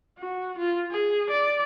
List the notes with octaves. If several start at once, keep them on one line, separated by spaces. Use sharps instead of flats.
F#4
F4
G#4
D5